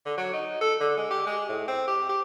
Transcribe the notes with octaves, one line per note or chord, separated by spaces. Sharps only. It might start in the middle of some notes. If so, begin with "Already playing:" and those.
D3
F#3
D#4
A4
D3
G#3
G4
G#3
A2
C4
G4
G4